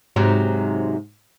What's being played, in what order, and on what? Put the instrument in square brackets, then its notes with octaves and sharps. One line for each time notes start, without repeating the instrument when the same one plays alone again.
[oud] G#2 C3 F#3